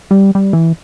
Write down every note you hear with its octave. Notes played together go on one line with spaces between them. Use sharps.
G3
G3
E3